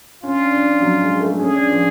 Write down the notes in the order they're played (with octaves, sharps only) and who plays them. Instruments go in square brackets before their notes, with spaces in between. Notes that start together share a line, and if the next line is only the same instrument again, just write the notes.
[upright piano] C#4 [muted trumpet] F4
[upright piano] D4
D4
C#4
F#3
G#3
A3
[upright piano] C#4 [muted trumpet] G#4
[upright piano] D4
F3